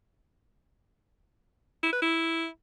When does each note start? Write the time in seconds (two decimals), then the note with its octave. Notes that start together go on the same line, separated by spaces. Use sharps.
1.83 E4
1.93 B4
2.02 E4